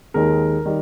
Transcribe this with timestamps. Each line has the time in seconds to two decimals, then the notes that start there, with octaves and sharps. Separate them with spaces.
0.14 D#2 D#3 G#3 A#4
0.66 D#3 G3